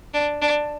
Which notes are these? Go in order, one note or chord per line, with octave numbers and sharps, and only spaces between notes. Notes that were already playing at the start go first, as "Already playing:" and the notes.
D4
D4